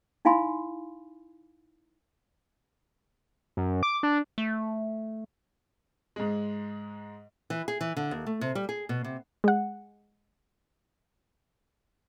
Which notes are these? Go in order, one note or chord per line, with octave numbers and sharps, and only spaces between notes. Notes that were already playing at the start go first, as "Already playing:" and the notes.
D#4 E4 F5 G#5 B5 C6
F#2
D6
D4
A3
G#2 G#3
E3
G#4
E3
D3
D#2
A3
C3
G3
G#4
B2
C3
G#3 F#5